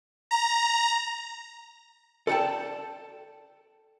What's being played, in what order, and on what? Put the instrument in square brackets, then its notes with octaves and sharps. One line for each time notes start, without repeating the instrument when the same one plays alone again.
[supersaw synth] A#5
[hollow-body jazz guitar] A4 D5 F#5 G5 A5